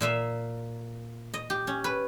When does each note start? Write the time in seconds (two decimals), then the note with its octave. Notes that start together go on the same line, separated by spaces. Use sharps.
0.01 A#2 A#3 E5
1.34 D#5
1.50 G4
1.67 C#4
1.84 B4